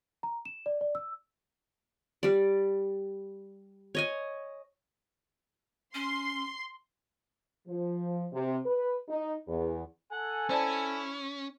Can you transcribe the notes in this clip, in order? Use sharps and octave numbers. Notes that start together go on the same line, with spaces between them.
A#5
E7
D5
D5
E6
G3 D5
C#5 D#5 G#5
C#4 C6
F3
C3
B4
D#4
E2
A4 F#5 G#5
C#4 E4 C5 D5 A5